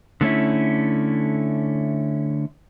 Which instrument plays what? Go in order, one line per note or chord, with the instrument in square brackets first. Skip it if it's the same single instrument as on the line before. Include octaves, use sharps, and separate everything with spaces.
[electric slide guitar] D3 A3 C#4 E4